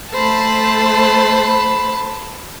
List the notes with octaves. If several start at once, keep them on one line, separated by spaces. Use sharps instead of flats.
A3 C5 A5 B5